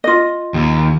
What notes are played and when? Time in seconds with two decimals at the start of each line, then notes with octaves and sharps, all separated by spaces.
0.04 F4 D#5
0.54 D#2